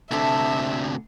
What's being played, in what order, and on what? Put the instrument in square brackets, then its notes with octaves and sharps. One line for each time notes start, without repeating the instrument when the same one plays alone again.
[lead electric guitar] D2 C3 [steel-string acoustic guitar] D4 A4 [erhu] E5